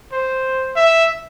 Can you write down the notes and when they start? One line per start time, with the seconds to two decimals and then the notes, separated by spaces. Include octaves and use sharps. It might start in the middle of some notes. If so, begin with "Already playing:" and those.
0.13 C5
0.76 E5